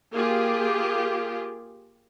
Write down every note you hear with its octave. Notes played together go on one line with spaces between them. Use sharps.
A#3 F4 G4 G#4